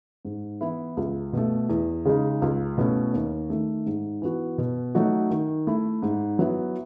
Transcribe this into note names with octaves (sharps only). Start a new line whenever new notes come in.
G#2
E3 B3 E4
C#2
B2 A3
E2
C#3 G#3 D#4
C#2
B2 A3 C#4 E4
D#2
D#3 A3
G#2
E3 B3 F#4
B2
F#3 A3 D#4 F#4
D#3
A3 E4
G#2
F#3 B3 E4